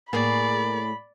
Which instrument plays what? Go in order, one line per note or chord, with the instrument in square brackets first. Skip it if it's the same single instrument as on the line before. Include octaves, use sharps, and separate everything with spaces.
[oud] A2 G#4 [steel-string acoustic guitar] A#3 [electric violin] D5 [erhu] B5